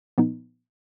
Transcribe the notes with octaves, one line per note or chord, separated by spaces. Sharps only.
A#2 F3 B3 D#4